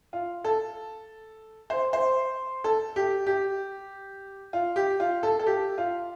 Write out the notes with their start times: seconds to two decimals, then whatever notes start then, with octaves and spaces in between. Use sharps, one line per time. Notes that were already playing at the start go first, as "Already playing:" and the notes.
0.13 F4
0.44 A4
1.70 C5
1.93 C5
2.64 A4
2.96 G4
3.26 G4
4.53 F4
4.76 G4
5.00 F4
5.23 A4
5.39 A4
5.46 G4
5.78 F4